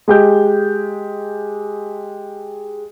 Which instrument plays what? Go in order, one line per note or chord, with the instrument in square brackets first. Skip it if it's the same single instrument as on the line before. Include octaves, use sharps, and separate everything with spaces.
[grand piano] G#3 G4 G6